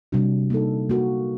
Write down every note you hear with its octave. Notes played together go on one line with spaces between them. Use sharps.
C3 G3 D4 F#4
A#3 D#4 A4
A#3 F#4 A#4